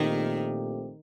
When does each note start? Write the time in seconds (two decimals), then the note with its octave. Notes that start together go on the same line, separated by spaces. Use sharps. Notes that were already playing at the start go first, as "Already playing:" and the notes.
Already playing: A#1 A#2 D#3 A3 C4 G4